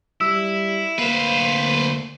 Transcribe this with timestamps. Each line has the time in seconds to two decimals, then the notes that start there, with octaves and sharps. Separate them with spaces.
0.21 G3 E4 E6
0.99 D2 A#3 B4 C5 F5